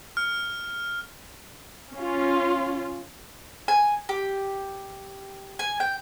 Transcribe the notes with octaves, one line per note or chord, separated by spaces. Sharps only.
F6
C#4 F4
G#5
G4
G#5
G5